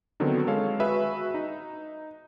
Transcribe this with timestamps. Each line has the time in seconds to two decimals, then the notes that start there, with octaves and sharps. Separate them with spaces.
0.20 D3 D#3 F#3 B3 C4
0.47 G#3 A4 C#5 F5
0.79 F#4 G#4 B4 E5
1.34 D#4